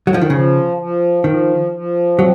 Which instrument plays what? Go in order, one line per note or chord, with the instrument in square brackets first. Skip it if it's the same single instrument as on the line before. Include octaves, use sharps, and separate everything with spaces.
[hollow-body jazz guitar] F#3
F3
D#3
[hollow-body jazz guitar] C#3 [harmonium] F3
[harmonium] F3
[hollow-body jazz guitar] D#3 [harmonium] F3
[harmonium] F3
[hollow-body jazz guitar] F#3 [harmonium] C4